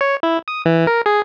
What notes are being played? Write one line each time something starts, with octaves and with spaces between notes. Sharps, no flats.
C#5
E4
D#6
E3
A#4
G#4